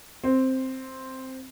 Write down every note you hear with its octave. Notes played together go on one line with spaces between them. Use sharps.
C4